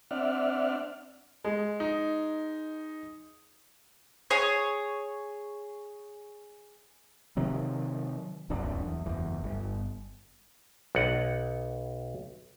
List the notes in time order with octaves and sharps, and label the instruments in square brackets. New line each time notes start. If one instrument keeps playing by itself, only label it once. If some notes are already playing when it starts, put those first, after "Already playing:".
[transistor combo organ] C4 D4 D5 E5 F#5 F6
[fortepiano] G#3
[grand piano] D#4
[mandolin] G#4 C#5
[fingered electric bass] C3 D#3 F#3
D1 C2 F#2 D4
E2
F#1 E2
G1
[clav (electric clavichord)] B1 F#5